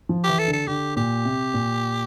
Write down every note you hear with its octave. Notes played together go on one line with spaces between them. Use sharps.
F3
G4
E3
A4
D3
A4
D3 G4
A#2 G4
C3
A#2